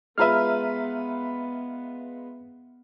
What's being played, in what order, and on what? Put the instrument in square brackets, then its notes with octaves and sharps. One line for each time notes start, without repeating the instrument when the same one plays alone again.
[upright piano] G#3 F4 B4 [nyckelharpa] B3 [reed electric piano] E5 A#5 F6